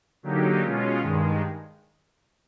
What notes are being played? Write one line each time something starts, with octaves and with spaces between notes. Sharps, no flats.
D3 F#3 A#3 D#4 G4
B2 G#3 C#4 F4
G2 D#3 G#3